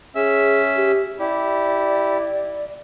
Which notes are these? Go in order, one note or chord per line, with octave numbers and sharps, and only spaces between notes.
C#4 G#4 E5 E6
G4
E4 G4 D5